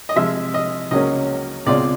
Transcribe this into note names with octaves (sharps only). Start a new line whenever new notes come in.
D#5
C3 F3 G#3 E5
D#5
C#2 C#3 F#3 A#3 C#4 D#5
C#2 B2 G#3 C4 F4 D5